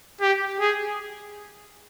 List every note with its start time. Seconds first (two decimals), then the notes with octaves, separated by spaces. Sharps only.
0.21 G4
0.60 G#4